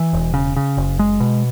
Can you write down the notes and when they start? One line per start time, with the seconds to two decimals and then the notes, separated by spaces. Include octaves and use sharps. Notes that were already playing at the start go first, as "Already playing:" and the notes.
Already playing: E3
0.13 E1
0.34 C#3
0.56 C#3
0.77 F#1
0.99 G#3
1.20 B2